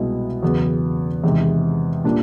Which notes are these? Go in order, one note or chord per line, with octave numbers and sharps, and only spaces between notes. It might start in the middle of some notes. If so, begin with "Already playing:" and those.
Already playing: C2 B2 G#3 B3 E4
E2 C#3 F#3 B3
E2 C3 D#3 G#3
A#2 G3 A#3 D4